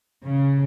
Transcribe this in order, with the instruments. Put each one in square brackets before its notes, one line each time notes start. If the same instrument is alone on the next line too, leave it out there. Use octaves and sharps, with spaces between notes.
[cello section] C#3